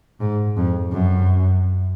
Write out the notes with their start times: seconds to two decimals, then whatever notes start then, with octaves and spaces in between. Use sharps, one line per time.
0.20 G#2
0.57 F2
0.91 F#2